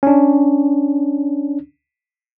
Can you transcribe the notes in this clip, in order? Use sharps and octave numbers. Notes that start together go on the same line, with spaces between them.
C#4 D4